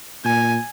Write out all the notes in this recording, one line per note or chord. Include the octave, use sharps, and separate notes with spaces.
A#2 G#5